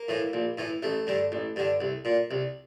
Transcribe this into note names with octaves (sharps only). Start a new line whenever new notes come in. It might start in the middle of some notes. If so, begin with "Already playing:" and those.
Already playing: A#3
A2 E3
A#1
A2 E3
A1 A3
G2 D3
A1
G2 D3
C2
A#2
C2